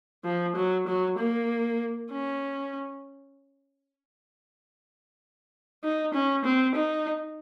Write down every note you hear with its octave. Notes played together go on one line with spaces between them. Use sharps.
F3
F#3
F#3
A#3
C#4
D#4
C#4
C4
D#4